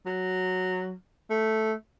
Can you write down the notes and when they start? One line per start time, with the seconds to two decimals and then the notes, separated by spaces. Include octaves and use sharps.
0.06 F#3
1.30 A3